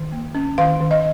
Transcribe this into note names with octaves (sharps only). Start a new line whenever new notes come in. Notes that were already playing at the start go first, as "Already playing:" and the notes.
Already playing: D#3
A#3
C#4
D#3 F5
D#3
D#5